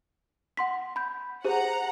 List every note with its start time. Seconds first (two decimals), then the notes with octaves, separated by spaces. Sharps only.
0.57 F#5 C6 B6
0.96 B5 G6
1.45 G4 G#4 C5 F#5 A#5